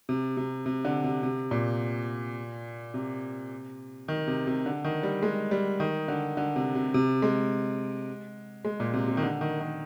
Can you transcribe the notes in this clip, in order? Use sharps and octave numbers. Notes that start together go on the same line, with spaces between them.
C3
C3
C3
D3
C3
C3
A#2
C3
D#3
C3
C3
D3
D#3
G3
G#3
G3
D#3
D3
D3
C3
C3
C3
G#3
G#3
A#2
C3
C3
D#3
D3
D#3
D#3